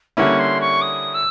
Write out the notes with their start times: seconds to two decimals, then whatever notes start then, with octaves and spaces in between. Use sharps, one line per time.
0.17 D3 G3 A#3 C#4 E4 C#6
0.39 C6
0.60 C#6
0.81 D#6
1.14 E6